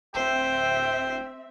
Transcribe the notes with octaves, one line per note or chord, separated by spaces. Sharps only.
D1 C4 C5 E5 G5